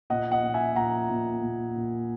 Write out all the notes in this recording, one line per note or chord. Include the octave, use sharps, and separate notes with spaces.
A#2 D#5 F#5
D#5 F#5
A#2
E5 G#5
A#2 F#5 A#5
A#2
A#2
A#2